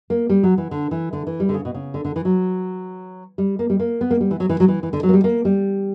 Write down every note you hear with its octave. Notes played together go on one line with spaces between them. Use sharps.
A#3
G3
F#3
E3
D3
E3
D3
E3
G3
D3
C#3
B2
C#3
D3
D3
E3
F#3
G3
A#3
G3
A#3
B3
A#3
G3
E3
F#3
E3
F#3
E3
E3
D3
F#3
A#3
G3
A#3
G3